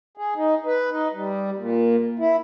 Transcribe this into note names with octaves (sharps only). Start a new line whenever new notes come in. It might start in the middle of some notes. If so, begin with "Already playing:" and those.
G#4
D#4
B4
D#4
G3
A#2
E4